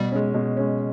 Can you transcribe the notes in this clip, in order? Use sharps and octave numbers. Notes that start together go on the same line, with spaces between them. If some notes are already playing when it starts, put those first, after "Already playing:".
Already playing: B2 G3
G#3 C#4
B2
G#3 C#4